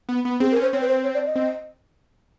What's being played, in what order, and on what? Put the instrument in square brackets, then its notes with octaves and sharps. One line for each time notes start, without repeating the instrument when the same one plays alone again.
[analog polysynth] B3
B3
[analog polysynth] C4 [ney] G#4
[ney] A#4
[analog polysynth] C#4
[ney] C5
[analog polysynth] C4 [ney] C#5
[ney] B4
C5
C#5
D5
D#5
[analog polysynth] C4